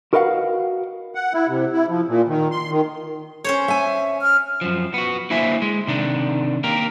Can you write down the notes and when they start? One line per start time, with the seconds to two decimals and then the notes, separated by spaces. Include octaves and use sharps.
0.13 F#4 A#4 B4 D#5 F5 F#5
1.15 F#5
1.33 E4
1.48 C3
1.72 E4
1.89 F3
2.08 A#2
2.29 D#3
2.51 C6
2.71 D#3
3.44 C#4 C5 C#5
3.68 E5 G#5
4.22 F6
4.61 F#2 F3
4.94 B3 F#4
5.30 D3 A#3 E4 C5 E5 G#5
5.62 G#3
5.87 C3 D#3 D4
6.64 A#3 G4 A#4